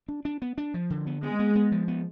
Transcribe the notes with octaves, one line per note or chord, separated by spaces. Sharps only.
D4
D4
B3
D4
F3
D3
B3
G#3 B3
B3
B3
F3
B3